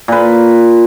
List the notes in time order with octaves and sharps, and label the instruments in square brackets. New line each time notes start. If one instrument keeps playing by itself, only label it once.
[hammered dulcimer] A#2 B4